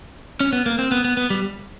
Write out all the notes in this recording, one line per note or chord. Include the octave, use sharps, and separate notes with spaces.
C#4
B3
A#3
C4
B3
B3
B3
G3